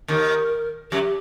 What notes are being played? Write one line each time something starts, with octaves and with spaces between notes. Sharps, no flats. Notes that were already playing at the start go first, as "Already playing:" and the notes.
D#2 D#3 A#4
F#2 F#3 G4